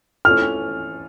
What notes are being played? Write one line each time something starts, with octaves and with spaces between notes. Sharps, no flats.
E3 A3 C#4 F4 A4 F6